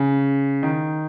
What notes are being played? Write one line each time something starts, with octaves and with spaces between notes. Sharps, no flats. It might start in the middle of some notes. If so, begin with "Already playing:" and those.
Already playing: C#3
D#3